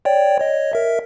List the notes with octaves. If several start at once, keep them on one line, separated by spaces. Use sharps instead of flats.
C#5 D5 G5
C#5 D#5
A#4 E5